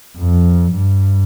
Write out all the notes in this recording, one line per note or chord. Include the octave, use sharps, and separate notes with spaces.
F2
G2